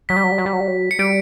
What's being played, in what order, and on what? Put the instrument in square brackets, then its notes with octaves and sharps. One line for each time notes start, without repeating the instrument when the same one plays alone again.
[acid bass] F#3 [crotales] B6
[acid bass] G3
F#3
G3
F#3
G3
F#3
G3
F#3
[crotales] C#7
[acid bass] G3 [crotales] D7